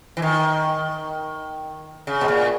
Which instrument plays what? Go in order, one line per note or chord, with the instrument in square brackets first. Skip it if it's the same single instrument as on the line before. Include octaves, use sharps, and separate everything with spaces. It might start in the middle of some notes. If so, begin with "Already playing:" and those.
[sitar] E3
D#3
C#3
B2
A#2